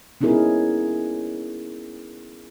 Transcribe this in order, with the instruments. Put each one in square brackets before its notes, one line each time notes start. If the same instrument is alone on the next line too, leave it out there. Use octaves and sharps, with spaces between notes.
[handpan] B3 C#4 D#4 E4 G#4 A#4